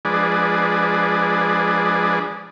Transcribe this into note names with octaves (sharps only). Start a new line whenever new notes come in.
F3 G#3 D4 G#4 B4 D5